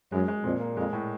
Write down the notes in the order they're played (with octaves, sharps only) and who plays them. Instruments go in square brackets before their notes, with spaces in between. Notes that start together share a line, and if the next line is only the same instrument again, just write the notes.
[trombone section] F#2 [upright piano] G#3
[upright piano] G#3
[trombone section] F2 [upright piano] A#2
[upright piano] A#3
[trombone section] F2 [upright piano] G#3
[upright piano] A2